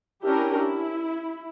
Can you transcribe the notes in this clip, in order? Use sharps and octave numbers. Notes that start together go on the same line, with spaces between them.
C#4 D4 E4 G4 A#4
E4